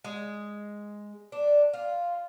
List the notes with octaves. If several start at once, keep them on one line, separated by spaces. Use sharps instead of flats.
G#3
D4
F4